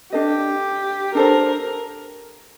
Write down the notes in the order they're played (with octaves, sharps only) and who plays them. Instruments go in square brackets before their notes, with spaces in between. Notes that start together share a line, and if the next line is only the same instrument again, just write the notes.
[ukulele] D4 A4 D#5 [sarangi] G4
[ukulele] D4 A4 C5 [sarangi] A#4